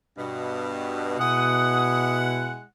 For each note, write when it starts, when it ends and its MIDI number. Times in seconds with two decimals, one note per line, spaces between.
0.17 1.19 43
0.17 1.19 47
1.19 2.62 47
1.19 2.63 56
1.19 2.63 64
1.19 2.63 78
1.19 2.17 87